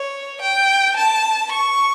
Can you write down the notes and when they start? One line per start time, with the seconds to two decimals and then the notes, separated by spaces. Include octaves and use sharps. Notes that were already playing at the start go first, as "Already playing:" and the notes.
Already playing: C#5
0.41 G5
0.96 A5
1.52 C#6